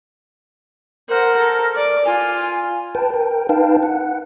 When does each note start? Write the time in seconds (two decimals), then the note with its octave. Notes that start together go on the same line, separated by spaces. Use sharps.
1.09 A#4 C5 F#5
1.37 A4
1.75 D5 D6
2.06 F4 G#5
2.95 B4 G5 A5
3.14 A#4 G5
3.49 D#4 B4 F5 G5 A5
3.83 F#5